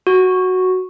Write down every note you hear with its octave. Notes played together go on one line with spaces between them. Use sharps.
F#4